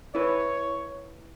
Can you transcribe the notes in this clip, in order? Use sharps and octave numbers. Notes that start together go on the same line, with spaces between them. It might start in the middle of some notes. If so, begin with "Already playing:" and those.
E4 A4 B4 C#5